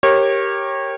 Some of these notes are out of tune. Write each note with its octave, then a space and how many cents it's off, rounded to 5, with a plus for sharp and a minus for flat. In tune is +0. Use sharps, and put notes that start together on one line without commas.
G4 +0 A#4 +0 C#5 -25